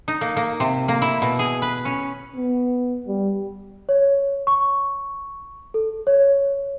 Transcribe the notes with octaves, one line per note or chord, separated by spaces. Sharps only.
D#4
A#3
A#3
C3
A#3
E4
B2
G#4
B4
C#4
B3
G3
C#5
C#6
A4
C#5